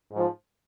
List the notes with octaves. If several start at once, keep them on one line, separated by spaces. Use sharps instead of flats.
G#2 F3